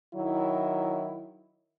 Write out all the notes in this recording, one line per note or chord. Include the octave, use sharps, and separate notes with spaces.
D#3 F#3 E4